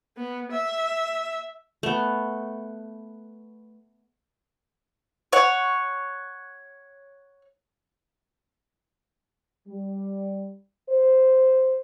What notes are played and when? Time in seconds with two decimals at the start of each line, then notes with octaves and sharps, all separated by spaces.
0.17 B3
0.52 E5
1.83 A3 B3
5.33 C#5 F#5
9.67 G3
10.89 C5